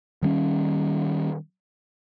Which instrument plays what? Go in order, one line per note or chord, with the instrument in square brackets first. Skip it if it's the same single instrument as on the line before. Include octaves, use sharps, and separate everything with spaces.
[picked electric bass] D#3 G3 C4 C#4